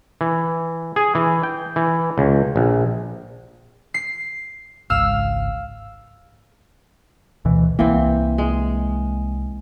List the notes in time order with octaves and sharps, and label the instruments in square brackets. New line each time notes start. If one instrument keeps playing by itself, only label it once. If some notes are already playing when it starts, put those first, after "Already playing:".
[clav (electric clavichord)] E3
G#4
E3
G5
E3
C#2
A#1
[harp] C7
[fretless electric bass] G#1 C#2 G#2 [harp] F5 E6
[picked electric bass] D2 B2 E3
[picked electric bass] C2 A#3 [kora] E3 C4
[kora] G#3